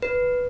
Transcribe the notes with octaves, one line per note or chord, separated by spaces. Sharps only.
B4